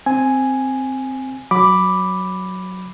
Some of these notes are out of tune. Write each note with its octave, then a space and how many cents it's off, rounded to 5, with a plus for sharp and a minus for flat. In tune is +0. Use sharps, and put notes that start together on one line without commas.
C4 +0 G#5 +0
F#3 +0 B5 +0 D6 +0